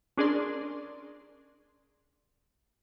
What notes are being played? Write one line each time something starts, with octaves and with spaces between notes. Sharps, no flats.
C#4 D4 G#4 A#4 D5 C6